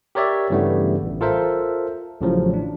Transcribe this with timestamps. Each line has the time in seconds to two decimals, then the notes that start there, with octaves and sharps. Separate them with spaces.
0.15 G4 A#4 C#5 D5 E5
0.50 G2 C#3 E3 G3 A3 B3
1.03 A1
1.21 F4 A4 A#4 C5 E5
2.20 A1 A2 C#3 F3 F#3
2.54 D4